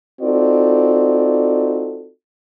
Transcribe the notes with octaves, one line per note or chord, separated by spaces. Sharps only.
C4 D#4 F4 F#4 A4 D5